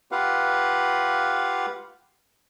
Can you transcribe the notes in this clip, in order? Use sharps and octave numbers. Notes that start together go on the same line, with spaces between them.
F4 G4 B4 F5 F#5